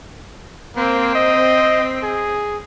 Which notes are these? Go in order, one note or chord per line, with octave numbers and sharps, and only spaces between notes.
A#3 C4
D#5
G#4